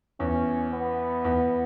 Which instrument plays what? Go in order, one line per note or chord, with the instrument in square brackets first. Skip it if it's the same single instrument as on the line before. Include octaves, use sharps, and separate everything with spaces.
[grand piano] E2 [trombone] C#4
[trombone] B3
[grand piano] E2